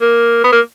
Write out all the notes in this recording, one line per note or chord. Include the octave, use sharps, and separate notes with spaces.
A#3
B3
A#3